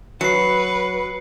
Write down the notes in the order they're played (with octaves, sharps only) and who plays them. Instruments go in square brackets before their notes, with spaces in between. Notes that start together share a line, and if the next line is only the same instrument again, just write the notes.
[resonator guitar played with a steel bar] F#3 [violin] B4 [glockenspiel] C7 C#7